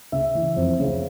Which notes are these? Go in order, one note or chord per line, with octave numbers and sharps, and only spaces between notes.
C#3 E5
E3
F2
C#3